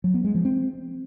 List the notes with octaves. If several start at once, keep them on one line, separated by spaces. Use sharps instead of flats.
F#3
B3
G#3
F3
C4